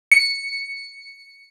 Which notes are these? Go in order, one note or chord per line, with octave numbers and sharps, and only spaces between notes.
C#7